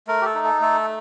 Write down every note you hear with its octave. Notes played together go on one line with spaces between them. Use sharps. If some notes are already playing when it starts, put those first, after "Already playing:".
A3 A#4
G4
A4
D#4
A4
A3 A4